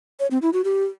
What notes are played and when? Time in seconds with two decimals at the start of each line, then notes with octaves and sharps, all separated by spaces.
0.20 C#5
0.31 C4
0.42 E4
0.53 F#4
0.64 G4